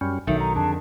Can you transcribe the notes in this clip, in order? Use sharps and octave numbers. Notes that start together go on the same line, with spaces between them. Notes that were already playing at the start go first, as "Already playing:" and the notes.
F#2 G3 C#4
B1 D#3 F#3 D#4 A4 E5
A#5
F2 D3 D4 G#4 A5